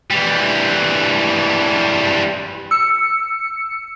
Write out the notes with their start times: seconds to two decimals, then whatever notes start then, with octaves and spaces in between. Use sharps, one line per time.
0.11 E3 G3
2.71 E6 C#7